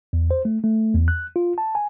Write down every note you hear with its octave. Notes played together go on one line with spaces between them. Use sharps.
E2
C5
A3
A3
E2
F#6
F4
A5
G#5